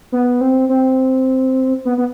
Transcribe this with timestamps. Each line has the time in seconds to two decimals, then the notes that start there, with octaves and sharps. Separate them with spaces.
0.12 B3
0.41 C4
0.69 C4
1.85 B3
1.98 B3